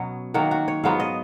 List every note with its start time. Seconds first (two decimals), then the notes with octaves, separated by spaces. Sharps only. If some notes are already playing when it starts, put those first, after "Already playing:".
Already playing: B2 F#3 B3 C#4
0.34 D#3 F#3 A#3 F#4
0.51 F#4
0.68 C#5
0.84 G#2 F#3 B3 F4 F5
1.00 D#5